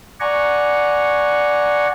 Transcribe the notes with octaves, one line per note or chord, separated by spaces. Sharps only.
D5 F#5 G#5 A#5 C#6